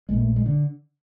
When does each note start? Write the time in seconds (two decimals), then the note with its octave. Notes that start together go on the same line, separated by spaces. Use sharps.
0.09 A#1 A#2 G#3
0.18 A3
0.36 G#3
0.46 D3